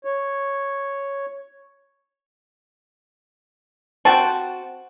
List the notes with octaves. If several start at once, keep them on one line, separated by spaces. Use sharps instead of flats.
C#5
C4 F#4 G5 A5